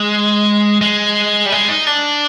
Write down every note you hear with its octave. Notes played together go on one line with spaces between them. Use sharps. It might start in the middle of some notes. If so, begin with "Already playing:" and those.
Already playing: G#3
G#3
G3
G#3
D#4
D4